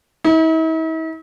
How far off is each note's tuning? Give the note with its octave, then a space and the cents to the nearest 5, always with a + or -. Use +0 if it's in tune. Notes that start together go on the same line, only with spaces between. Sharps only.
E4 -45